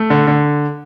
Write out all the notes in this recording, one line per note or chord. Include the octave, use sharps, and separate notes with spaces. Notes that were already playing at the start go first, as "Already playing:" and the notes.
Already playing: A3
D3
D3